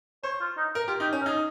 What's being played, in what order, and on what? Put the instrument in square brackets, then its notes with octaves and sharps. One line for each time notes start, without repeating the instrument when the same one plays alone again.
[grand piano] C5 [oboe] C#5
[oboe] F4
D#4
[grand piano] A#4
[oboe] F4 [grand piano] G4
[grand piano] D#4 [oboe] G4
[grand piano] C#4
[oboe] A#4
[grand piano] D#4 [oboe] G#4